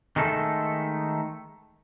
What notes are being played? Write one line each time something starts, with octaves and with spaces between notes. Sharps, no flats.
D#3 G#3 A3 E4 A4